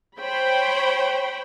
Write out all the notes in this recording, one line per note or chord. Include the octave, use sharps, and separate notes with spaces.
C5 C#5 G5 B5